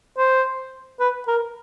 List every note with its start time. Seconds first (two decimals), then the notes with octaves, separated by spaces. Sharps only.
0.18 C5
1.00 B4
1.27 A#4